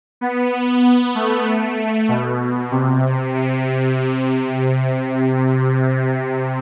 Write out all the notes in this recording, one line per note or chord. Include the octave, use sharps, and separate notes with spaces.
B3
A3
B2
C3
C3
C3